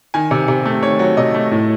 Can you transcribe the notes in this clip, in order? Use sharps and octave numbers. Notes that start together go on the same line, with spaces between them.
D#3 G#5
C3
C3
A3
D#3 C#5
F#3
C3 D#5
A3
A2